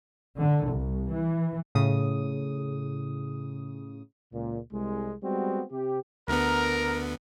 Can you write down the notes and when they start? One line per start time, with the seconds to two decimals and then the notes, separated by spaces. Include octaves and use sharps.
0.39 D3
0.69 C2
1.11 E3
1.75 A2 C#3 D#6
4.33 C#2 A#2
4.73 C2 G#3
5.23 G3 G#3 B3 C4 F#4
5.71 C3 G4
6.28 D2 D3 B3 A#4